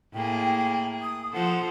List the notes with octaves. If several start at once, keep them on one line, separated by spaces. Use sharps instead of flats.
A2 A#3 G#4 G5
D#6
F3 A4 C5 F#5